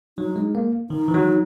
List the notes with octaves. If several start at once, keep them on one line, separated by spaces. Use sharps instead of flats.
F#3 D#4
G#3
A#3
D#3 D#4
E3
F#3